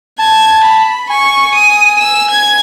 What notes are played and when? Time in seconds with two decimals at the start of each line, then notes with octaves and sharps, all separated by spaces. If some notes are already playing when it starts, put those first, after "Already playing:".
0.19 A5 G#6
0.64 B5
1.10 G#5 C#6
1.55 D#6
2.00 E6
2.30 G#6